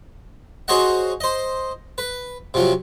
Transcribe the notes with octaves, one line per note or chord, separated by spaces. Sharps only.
F#4 G#4 C5 C#5 D#5 F#5
C5 D#5
B4
C3 F3 F#3